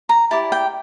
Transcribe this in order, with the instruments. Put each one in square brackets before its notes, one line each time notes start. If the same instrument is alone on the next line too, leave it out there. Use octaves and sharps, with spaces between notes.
[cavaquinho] A#5
E4 G4 D5 A5
G5